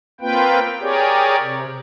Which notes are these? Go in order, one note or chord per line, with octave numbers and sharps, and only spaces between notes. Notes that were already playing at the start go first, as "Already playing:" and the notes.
A#3 C4 F4 B4 G5
G4 G#4 A#4 C#5 D5
C3